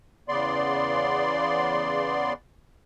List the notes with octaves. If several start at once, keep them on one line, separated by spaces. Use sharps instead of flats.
E2 C#3 B3 D5 C6